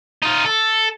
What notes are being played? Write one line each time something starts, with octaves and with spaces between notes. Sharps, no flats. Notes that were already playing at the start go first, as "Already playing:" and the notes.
D#4 F4
A4